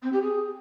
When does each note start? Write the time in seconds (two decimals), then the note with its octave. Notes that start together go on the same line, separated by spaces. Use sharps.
0.02 C4
0.12 G4
0.22 G#4